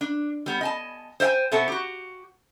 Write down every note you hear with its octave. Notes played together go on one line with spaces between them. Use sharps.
D4
G3 B3
D#5 G#5 A5
C5 D5 E5 G5 G#5
B2 B3 C4 A4 E5 A5
F#4 G4